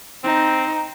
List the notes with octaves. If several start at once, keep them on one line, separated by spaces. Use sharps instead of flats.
C4 D#4